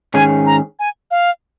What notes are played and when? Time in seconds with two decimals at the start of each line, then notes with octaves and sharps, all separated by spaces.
0.14 G#2 D#3 C#4 G#4 G#5
0.46 A#5
0.79 G#5
1.11 F5